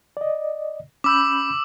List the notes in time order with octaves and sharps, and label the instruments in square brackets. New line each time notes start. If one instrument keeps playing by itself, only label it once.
[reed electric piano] D5 D#5
[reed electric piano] C#4 B5 G6 [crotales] D6 E6